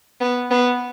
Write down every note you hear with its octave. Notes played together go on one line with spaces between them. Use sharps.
B3
B3